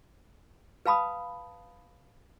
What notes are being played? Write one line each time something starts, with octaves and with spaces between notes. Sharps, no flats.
B4 F5 A5 B5 D#6